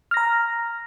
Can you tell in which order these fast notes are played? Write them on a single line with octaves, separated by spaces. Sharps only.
F6 A#6 A#5